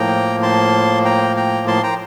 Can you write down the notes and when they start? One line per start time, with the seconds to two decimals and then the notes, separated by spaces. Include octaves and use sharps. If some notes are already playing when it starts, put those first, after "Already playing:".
Already playing: A2 F3 A#3 G5 A#5
0.43 A5 C6
1.05 G5 A#5
1.37 G5 A#5
1.68 A5 C6
1.83 G5 A#5